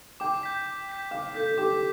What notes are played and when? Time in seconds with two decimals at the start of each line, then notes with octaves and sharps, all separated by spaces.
0.20 G5 D6
0.43 G6 B6
0.66 D6
0.89 G6 B6
1.11 F5 D6
1.34 A4 G6 B6
1.49 A4
1.58 G4 D6